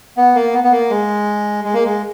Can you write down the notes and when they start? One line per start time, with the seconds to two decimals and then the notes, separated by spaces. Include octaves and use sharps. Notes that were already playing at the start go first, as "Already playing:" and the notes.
0.17 B3
0.35 A#3
0.54 B3
0.64 B3
0.72 A#3
0.90 G#3
1.65 G#3
1.74 A#3
1.85 G#3